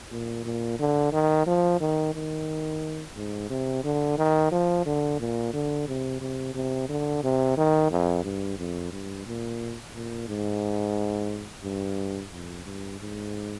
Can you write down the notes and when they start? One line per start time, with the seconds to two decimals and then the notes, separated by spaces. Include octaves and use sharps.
0.11 A#2
0.45 A#2
0.79 D3
1.12 D#3
1.47 F3
1.81 D#3
2.15 D#3
3.16 G#2
3.50 C3
3.84 D3
4.18 D#3
4.52 F3
4.86 D3
5.20 A#2
5.54 D3
5.88 C3
6.21 C3
6.55 C3
6.89 D3
7.24 C3
7.57 D#3
7.91 F2
8.24 G2
8.59 F2
8.93 G2
9.27 A#2
9.95 A#2
10.28 G#2
11.63 G2
12.32 F2
12.66 G2
13.00 G#2